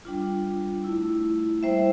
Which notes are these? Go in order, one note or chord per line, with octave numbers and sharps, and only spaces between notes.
G3 D4 F4
A3 E4
G3 A#3 E4 C5 E5